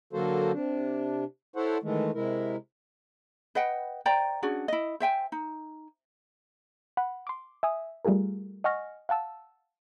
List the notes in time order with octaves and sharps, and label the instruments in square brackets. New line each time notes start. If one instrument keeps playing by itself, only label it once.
[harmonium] D3 F#3 A#3 F#4 A4 C5
C3 D4
E4 A4 C5 C#5 F#5
D#3 E3 G#3 A3
C3 G#3 E4 A#4
[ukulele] B4 D#5 F#5 G5
C5 D5 G5 A#5
C#4 D4 F#4 G#4
E4 D#5
C5 E5 G5 G#5
D#4
[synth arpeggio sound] F#5 B5
C6 D6
E5 G#5 D#6
G3 A3 F4 G#4 A#4
D#5 F#5 G#5 C#6 F6 A#6
F5 F#5 A5 E6